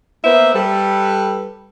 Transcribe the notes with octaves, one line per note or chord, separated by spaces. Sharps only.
A#3 B3 C5 E5
G3 A4 B4